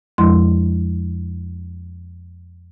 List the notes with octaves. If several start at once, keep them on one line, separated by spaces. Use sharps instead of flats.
F2 F3 G#3 E4 C6